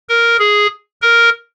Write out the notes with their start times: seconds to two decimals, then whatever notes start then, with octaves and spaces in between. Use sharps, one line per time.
0.09 A#4
0.39 G#4
1.02 A#4